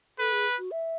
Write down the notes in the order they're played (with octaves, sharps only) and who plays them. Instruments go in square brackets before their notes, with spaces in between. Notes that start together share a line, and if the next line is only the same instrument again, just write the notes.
[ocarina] A4 [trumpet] B4
[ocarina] G#4
F#4
E5